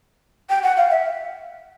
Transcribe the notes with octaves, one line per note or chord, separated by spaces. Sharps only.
G5
F#5
F5
E5